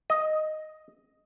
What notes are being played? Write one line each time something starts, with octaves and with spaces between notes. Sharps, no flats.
D#5